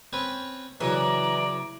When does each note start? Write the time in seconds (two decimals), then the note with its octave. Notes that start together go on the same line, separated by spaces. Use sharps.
0.13 C4 C#4 B4
0.80 C#3 E3 F#3 C#4 D5 A#5